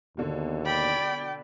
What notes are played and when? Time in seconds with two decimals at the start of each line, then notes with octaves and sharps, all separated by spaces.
0.17 D#2 B2 D3
0.66 D5 G5 B5